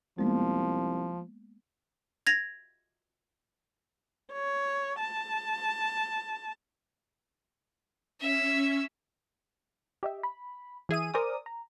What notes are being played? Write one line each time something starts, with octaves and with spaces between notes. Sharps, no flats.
C2 F3 G#3 A#3 B3
G#6 A#6 F7
C#5
A5
C#4 E5
G4 D#5 E5
B5
E3 G#4 E5 D#7
A#4 C5 D5 G#5 D6 D#6
A#5